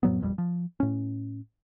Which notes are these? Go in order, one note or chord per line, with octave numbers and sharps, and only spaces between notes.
F2 A2 F#3 B3
E1 A#1 F2 G3
F3
A2 C#4